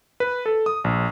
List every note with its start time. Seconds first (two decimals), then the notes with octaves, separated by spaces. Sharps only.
0.20 B4
0.46 A4
0.66 D#6
0.84 A#1